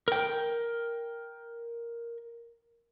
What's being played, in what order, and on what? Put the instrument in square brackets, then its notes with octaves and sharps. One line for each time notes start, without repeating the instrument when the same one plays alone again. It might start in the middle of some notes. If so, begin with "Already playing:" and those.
[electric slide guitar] A#4 G5